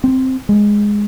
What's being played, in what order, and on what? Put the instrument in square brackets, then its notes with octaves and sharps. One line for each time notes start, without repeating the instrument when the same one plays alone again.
[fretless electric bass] C4
G#3